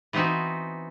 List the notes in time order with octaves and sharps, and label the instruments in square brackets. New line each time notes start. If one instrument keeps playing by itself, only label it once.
[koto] E3 B3 C4 D#4 F#4